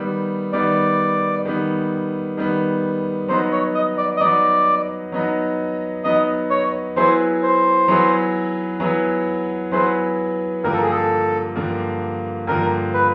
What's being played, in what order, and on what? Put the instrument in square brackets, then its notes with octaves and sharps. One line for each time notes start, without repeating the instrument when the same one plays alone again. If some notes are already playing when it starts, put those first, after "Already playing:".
Already playing: [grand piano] D#3 G3 B3
[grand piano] D#3 G3 B3 [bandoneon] D5
[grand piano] D#3 G3 B3
D#3 G3 B3
[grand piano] F#3 B3 D#4 [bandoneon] C5
[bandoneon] C#5
D#5
D5
D#5
[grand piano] F#3 B3 D#4 [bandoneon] D5
[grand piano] F#3 B3 D#4
[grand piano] F#3 B3 D#4 [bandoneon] D#5
[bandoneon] C#5
[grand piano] F#3 B3 E4 G#4 B4 [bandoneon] C5
[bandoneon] C5
[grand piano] F#3 B3 E4 G#4 B4
F#3 B3 E4 G#4 B4
[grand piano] F#3 B3 E4 G#4 B4 [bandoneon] C5
[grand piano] G2 D3 F3 A#3 [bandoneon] A#4
[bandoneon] A4
G#4
A4
[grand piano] G2 D3 F3 A#3
[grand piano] G2 D3 F3 A#3 [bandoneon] A#4
[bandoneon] B4